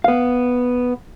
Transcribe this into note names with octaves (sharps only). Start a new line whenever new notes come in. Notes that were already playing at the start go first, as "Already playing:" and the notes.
B3 F5